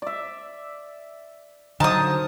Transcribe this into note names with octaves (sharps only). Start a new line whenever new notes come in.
D5 E5
D3 F#3 D#4 A#4 C5 A5 D#6